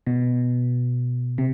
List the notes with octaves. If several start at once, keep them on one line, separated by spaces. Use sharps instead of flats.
B2
C3